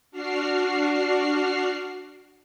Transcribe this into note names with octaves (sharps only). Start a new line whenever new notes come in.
D4 F#4 F6 C7